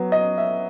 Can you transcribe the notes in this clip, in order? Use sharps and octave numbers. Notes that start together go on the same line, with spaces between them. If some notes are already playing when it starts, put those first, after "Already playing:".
Already playing: F#3 B3
D#5
E5